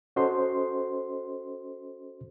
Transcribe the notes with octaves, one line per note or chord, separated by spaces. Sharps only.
C#4 F#4 A4 C5 D#5 C6